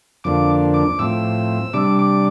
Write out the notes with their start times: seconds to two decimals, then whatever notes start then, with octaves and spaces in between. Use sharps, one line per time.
0.24 F2 D3 F3 A#3 D4 D6
0.74 D6
0.99 A2 F3 C4 E6
1.73 C3 G3 D4 D6
1.99 D6